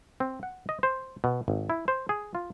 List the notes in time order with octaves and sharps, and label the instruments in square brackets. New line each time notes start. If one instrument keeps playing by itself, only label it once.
[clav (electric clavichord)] C4
F#5
D#5
C5
B2
G#1
E4
C5
G#4
F4